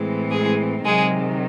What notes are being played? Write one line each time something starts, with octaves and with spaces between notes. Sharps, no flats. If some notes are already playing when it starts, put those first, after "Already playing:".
Already playing: A2 E3 G#3 C4
G#3 G#4
C3 D#3 F#3 G#3 G#4